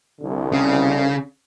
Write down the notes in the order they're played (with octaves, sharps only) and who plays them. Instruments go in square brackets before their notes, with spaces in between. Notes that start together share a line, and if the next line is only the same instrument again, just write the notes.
[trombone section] C2 D3
[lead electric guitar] C#3